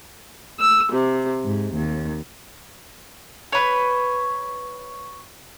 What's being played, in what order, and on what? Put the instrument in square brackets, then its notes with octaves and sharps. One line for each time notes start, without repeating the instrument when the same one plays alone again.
[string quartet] E6
C3
G#2
D#2
[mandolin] B4 C#5